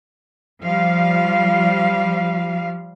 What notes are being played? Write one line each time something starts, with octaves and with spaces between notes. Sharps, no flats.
F3 G3 F5